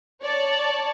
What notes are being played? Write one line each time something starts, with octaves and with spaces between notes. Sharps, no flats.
C#5 D5 A5